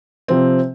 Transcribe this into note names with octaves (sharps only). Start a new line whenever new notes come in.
C3 F3 C4